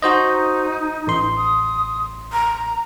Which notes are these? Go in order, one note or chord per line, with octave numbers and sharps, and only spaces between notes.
D#4 F#4 C5 D#5
A1 C6
D#6
A#5